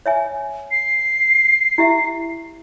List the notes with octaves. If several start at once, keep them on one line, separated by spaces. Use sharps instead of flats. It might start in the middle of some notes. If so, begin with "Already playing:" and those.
C#5 E5 G#5
C7
E4 G4 E5